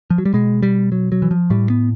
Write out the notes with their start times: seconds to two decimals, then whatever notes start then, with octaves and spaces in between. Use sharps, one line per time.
0.10 F3
0.18 F#3
0.25 G3
0.33 B2 G#3
0.62 G3
0.92 F#3
1.12 F#3
1.22 E3
1.31 F3
1.50 A2 G3
1.70 B3